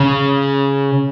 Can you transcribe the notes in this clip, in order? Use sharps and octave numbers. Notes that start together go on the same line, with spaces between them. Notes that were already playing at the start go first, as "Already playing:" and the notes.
Already playing: C#3